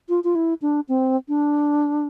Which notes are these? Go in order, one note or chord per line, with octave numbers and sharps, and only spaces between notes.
F4
F4
E4
D4
C4
D4